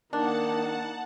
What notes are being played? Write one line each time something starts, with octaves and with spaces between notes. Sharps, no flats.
D#3 A#3 D4 D#4 F#5 A5